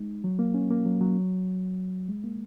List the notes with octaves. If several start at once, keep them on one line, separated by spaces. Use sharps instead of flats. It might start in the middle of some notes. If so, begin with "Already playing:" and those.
Already playing: G#3 D#4
F#3
A#3
C#4
A#3
F#3
F#3
G#3
A#3